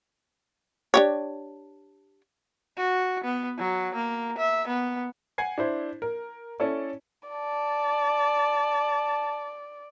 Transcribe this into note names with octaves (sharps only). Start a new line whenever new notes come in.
D4 G4 C#5
F#4
B3
F#3
A#3
E5
B3
F#5 G#5 G#6 C7
D4 E4 C5
A#4
C#4 E4 A4 D5
D5 A5